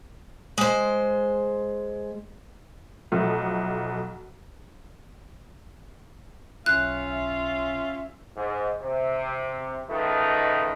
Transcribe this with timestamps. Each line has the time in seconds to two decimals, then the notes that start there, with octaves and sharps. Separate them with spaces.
0.58 G#3 C5
3.12 B1 F3 A3
6.66 B1 C#4 F4 E5 F#6
8.37 G#2
8.79 C3
9.89 C#2 D#3 A3 D#4 B4